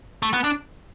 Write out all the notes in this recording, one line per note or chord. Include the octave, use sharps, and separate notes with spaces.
A3
B3
D4